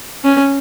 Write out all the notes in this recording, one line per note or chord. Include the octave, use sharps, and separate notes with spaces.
C#4